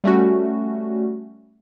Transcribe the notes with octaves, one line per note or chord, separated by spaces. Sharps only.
G3 A3 C#4 F#4